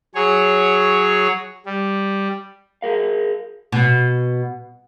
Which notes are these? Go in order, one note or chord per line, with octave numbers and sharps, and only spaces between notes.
F#3 G#4 C#5
G3
G#4 A#4 F5
B2